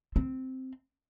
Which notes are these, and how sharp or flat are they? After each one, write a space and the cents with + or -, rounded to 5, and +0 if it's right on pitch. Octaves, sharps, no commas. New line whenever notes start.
C4 -5